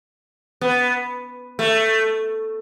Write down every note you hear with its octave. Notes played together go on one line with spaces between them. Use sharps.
B3
A3